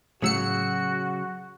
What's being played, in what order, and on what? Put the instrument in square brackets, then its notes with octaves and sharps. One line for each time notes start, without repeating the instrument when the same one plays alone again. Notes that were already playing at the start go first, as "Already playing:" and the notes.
[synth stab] A2 E6 C#7 [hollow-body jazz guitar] C#3 F#3 [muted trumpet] F#4